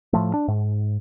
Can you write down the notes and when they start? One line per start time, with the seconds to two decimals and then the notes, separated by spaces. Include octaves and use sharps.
0.13 A2 F3 A3
0.34 D4
0.48 G#2